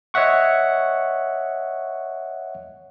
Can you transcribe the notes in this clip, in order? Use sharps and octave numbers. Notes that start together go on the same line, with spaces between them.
C#5 D#5 E5 F#5 C#6